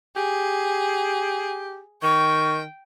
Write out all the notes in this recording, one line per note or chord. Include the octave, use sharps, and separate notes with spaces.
G4 G#4
D#3 G5 C#6